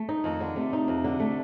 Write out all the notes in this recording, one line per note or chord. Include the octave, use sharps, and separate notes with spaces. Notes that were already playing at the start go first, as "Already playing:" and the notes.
Already playing: A3
D#4
F2 D#3
D3
C3 A3
D#4
F2
D3
A3